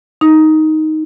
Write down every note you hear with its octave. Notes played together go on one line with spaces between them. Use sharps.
D#4